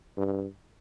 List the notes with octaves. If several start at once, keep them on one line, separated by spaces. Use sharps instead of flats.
G2